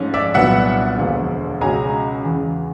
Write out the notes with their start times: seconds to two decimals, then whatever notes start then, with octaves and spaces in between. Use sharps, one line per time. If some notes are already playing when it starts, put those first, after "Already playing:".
Already playing: G#2 F3 A3 C#4
0.14 D5 E5
0.34 C2 A#2 F#3 B3 D4 E5 F#5
0.98 E1 D2 D3 F3 A#3
1.61 C#2 B2 G#3 C#4 G#5 A#5
2.24 E2 C#3 E3